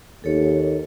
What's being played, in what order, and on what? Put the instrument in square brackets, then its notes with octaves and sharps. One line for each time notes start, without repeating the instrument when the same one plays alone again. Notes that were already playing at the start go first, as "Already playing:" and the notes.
[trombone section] D#2 [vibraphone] A4 C#5